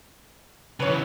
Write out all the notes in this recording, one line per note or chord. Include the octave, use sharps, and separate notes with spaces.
C#3 E3 B4 C#5